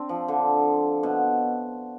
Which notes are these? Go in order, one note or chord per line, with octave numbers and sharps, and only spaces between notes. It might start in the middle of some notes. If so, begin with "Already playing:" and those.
Already playing: C4 D4
F3
D3
B2